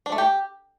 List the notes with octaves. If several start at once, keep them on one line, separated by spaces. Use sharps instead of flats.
D4
A3
G4